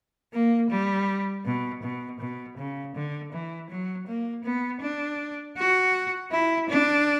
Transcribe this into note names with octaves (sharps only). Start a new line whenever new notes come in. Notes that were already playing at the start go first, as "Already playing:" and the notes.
A#3
G3
B2
B2
B2
C#3
D3
E3
F#3
A#3
B3
D4
F#4
E4
D4